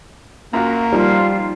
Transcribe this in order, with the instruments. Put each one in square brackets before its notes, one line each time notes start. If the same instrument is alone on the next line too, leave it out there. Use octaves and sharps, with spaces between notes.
[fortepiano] F#2 F4 F#4 [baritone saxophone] A#3
[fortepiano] F3 [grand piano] G3 D#4 [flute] F4